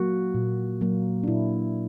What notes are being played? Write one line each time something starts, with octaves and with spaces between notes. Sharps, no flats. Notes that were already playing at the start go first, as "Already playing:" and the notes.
Already playing: F#3 A#3 F#4
A#2
F#3 A#3
D4
A#2 E4